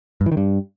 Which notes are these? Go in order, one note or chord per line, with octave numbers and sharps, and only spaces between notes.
G2
E3
D#3
G2